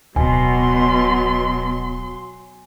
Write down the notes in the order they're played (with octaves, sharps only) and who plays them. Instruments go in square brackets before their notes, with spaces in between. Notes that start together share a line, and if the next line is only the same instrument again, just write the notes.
[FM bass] D1 [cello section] B2 [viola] F#3 C6 [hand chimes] G#5